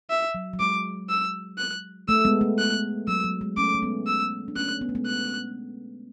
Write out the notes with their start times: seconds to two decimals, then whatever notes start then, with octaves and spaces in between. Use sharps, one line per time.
0.10 E5
0.35 F#3
0.53 F#3
0.60 G#3 D6
1.09 E6
1.58 F#6
2.08 A3 E6
2.25 G#3 B3
2.41 A3
2.59 F#6
3.08 F#3 E6
3.24 F#3
3.41 G#3
3.57 A3 C#4 D6
3.75 A3
3.82 G#3 B3
4.07 E6
4.48 D4
4.56 A3 C#4 F#6
4.81 B3
4.89 A3
4.95 G#3 B3
5.06 F#6